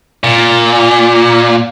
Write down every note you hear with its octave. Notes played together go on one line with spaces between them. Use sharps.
A#2